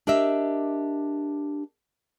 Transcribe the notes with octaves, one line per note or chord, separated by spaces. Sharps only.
D4 G4 A#4 D#5 E5